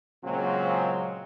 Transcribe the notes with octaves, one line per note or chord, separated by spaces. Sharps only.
A#2 C#3 F#3 G#3 A#3 C4